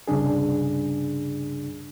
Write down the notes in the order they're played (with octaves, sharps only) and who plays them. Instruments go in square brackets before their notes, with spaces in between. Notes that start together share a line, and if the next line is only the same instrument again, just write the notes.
[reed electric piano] C2 G2 C#3 D4 G#4